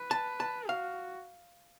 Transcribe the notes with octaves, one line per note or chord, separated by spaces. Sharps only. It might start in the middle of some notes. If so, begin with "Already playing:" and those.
Already playing: B4
A5
A5
F#4 F5